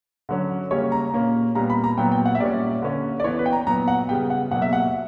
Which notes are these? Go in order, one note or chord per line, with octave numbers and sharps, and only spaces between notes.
D3 F#3 C#4
C#3 G3 A#3 C#4 C#5
A#5
A#2 A#3 C#4
A#2 G3 B3 A#5
B5
A#5
A#2 F#3 B3 G5
G5
F#5
E5
A#2 G3 C#4 D5
D3 A#3 C#4
D5
E3 B3 C#5
B4
G5
A#5
A#2 F#3 B3 A#5
F#5
C#3 G3 B3 G5
F#5
B2 F#3 A#3 F#5
E5
F#5